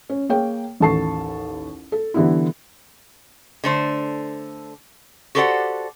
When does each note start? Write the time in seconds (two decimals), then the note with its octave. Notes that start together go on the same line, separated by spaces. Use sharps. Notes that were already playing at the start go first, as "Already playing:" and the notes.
0.10 C#4
0.29 A#3 G#4 C#5 G5
0.80 A1 D#2 A4 A5 C#6 C7
1.92 A4
2.14 D3 E3 G3 B3 E4
3.64 D3 A3 C5
5.35 F#4 G4 A4 C5 D5 F#5